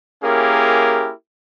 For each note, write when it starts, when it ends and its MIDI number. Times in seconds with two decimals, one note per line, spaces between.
0.23 1.12 58
0.23 1.12 61
0.23 1.12 64
0.23 1.12 67
0.23 1.12 68
0.23 1.12 70